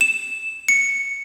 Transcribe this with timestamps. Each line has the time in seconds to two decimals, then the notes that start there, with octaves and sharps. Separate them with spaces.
0.01 E7
0.68 C#7